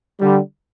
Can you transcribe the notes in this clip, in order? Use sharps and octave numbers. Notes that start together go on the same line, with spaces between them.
D3 G3